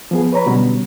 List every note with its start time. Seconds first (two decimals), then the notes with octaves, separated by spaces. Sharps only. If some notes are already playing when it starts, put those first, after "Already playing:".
0.11 F3 B3 G#4
0.33 B4 C#5 A#5 B5
0.46 B2 D3 F#3 G3 B3 C#4